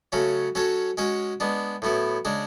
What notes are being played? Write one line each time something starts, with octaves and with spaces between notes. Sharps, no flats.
C#3 F#3 A3 C#4 F#4
F#3 C#4 F#4 A4 C#5
G#3 C#4 F#4 C#5
G#3 B3 D4
A2 F#3 B3 E4
C#3 G#3 D4 G#4